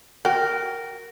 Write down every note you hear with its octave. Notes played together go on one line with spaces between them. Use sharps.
F#4 A#4 G5